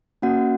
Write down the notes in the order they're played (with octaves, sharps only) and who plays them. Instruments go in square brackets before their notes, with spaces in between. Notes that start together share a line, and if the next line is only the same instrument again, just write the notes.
[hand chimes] A#3 C#4 F#4 F#5